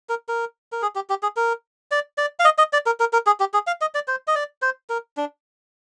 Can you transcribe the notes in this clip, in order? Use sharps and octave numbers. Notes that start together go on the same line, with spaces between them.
A#4
A#4
A#4
G#4
G4
G4
G#4
A#4
D5
D5
F5
D#5
D#5
D5
A#4
A#4
A#4
G#4
G4
G#4
F5
D#5
D5
C5
D#5
D5
C5
A#4
D4